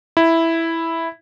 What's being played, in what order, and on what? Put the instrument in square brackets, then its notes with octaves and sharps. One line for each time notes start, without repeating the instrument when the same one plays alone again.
[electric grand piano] E4